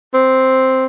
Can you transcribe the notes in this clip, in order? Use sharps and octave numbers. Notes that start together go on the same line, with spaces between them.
C4